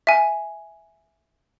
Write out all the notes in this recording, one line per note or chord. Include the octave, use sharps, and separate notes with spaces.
E5 G#5